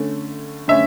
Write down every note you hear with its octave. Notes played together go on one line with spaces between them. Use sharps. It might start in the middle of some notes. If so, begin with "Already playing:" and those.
Already playing: D3 A3 C#4
D3 A3 C#4 E5